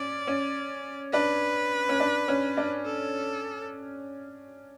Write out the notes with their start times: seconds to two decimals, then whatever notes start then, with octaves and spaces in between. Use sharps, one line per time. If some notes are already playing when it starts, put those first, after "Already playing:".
Already playing: C#4 D5
0.27 C#4
1.13 D4 B4
1.89 C#4
2.00 D4
2.28 C#4
2.57 D4
2.85 A4